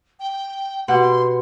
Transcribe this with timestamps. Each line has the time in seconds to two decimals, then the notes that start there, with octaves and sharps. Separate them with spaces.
0.20 G5
0.88 B2 G4 F#5 C6